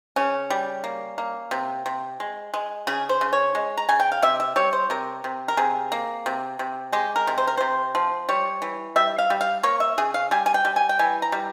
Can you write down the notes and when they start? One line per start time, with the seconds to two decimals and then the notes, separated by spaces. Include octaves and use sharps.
0.16 C#3 C#4
0.50 G3
0.84 A#3
1.18 A#3
1.51 C3
1.86 C3
2.20 G#3
2.54 G#3
2.87 C#3 G#4
3.09 C5
3.21 C#3
3.33 C#5
3.55 G#3
3.77 A#5
3.89 C#3 G#5
4.00 G5
4.12 F5
4.22 C3 E5
4.40 E5
4.56 G3 C#5
4.73 C5
4.90 C3 A#4
5.24 C3
5.48 A#4
5.57 C3 G#4
5.92 A#3
6.26 C3
6.59 C3
6.92 G#3 G4
7.16 A#4
7.27 C3
7.38 C5
7.47 A#4
7.57 C3 C5
7.95 F3
8.29 G3 C#5
8.62 E3
8.96 G3 E5
9.18 F5
9.30 G3
9.41 F5
9.63 A#3 C#5
9.80 E5
9.98 C#3 G#4
10.14 F5
10.31 G3 G#5
10.46 G#5
10.54 G5
10.65 G3
10.76 G#5
10.89 G5
10.99 E3 G#5
11.22 A#5
11.32 G3